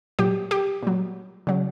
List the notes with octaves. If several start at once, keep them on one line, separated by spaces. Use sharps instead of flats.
A#2 F#3 G4
G4
A#2 F#3
C#3 F#3